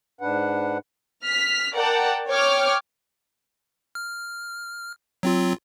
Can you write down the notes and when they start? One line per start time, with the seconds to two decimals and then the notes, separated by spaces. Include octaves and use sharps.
0.21 G#2 D4 B4 F#5
1.23 F6 B6
1.73 A#4 D5 F#5 G5 A5
2.28 C#5 G5 D6 F6
3.95 F6
5.23 F#3 C4 F4